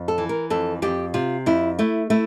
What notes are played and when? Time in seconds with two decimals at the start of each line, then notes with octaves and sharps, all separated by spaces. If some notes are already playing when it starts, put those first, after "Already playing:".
Already playing: F2
0.08 A4
0.18 E3
0.29 A#4
0.50 F2 A4
0.82 F2 G4
1.14 C3 F4
1.46 F2 E4
1.79 A3 E4
2.10 A3 E4